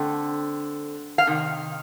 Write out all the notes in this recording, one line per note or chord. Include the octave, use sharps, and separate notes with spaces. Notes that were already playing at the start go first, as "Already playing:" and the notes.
Already playing: D3 A3 C4 G5
F5
C3 D#3